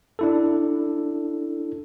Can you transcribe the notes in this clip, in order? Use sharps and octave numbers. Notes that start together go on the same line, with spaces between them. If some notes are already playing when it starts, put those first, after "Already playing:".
D4 E4 A4